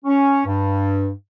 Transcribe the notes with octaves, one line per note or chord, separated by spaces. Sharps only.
C#4
G2